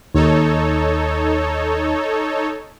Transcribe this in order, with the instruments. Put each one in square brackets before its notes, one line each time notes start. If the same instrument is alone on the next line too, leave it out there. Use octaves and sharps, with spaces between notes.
[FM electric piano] D#2 [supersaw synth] D#4 A4 C#5